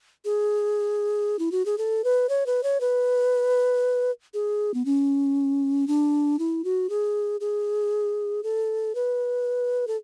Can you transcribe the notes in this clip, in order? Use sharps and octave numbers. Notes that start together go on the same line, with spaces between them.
G#4
E4
F#4
G#4
A4
B4
C#5
B4
C#5
B4
G#4
B3
C#4
D4
E4
F#4
G#4
G#4
A4
B4
A4